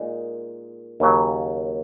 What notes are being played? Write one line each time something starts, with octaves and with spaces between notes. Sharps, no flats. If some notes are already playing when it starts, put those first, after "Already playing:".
Already playing: A#2 G#3 D#4
D#2 C#3 F#3